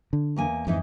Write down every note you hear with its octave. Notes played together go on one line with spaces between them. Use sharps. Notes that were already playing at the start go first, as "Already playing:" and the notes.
D3
E2 A#3 G#5
F2 G#2 E3 D#4